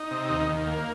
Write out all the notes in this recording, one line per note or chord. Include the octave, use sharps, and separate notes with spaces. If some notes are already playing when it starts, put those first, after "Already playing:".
Already playing: D#4
C3
D#2
D#2
A#3